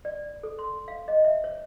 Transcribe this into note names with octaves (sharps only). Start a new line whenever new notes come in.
D5
A4
C6
F5
D#5
E5
C#5